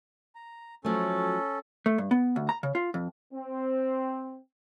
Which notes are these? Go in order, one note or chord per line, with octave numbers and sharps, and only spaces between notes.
A#5
F3 F#3 A3 C#4 A4
A3
G2
B3
D2
A#5
C#3
F4
F2
C4